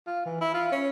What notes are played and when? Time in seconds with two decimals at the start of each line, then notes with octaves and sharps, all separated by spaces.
0.07 F4
0.26 E3
0.41 E4
0.54 F4
0.72 C#4